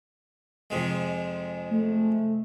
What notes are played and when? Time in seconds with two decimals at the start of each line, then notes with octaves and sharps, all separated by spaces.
0.70 F2 C3 G#3
1.70 A3